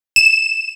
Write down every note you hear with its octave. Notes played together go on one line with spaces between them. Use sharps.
E7